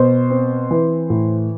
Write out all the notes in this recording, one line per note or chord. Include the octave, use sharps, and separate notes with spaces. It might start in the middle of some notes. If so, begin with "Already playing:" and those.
Already playing: B2 C5
C4
E3
A2